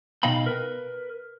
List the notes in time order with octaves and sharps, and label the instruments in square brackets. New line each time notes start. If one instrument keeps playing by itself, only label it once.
[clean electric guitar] B2 D#4 D#5 F5 G5 B5
A#4 B4